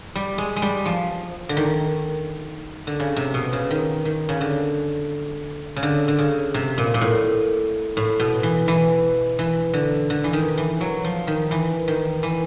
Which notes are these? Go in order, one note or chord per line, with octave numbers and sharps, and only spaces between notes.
G3
G#3
G#3
G3
F3
D3
D#3
D3
C#3
C3
B2
C#3
D#3
D#3
C#3
D3
C#3
D3
D3
C#3
C3
A#2
A#2
A2
A2
B2
E3
E3
E3
D3
D3
E3
D#3
E3
F#3
F3
D#3
E3
D#3
E3